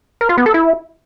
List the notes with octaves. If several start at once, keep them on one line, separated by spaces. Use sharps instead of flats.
A#4
F4
B3
A4
E4